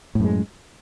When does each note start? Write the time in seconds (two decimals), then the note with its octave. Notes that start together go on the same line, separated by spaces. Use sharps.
0.15 A2
0.20 F#2
0.24 G#3